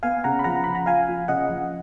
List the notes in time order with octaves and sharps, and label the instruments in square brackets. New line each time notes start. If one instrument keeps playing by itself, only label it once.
[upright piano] B3 [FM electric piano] F5 G#5
[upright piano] C#3 [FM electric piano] F#5 A#5
[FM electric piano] B5
[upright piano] F3 [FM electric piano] F#5 A#5
[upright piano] C#3 [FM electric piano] B5
[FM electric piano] A#5
[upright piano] F3 [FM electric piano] F5 G#5
[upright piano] F4
[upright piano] C#3 [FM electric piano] D#5 F#5
[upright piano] F3